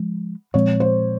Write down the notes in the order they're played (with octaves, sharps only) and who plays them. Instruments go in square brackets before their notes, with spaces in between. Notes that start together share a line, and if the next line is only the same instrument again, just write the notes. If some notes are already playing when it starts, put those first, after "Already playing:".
Already playing: [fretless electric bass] F3 G#3
[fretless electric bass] A#2 F3 G#3 C4 [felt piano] C#5
[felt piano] C5